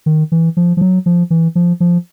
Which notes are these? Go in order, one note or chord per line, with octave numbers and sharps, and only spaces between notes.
D#3
E3
F3
F3
F#3
F3
E3
F3
F3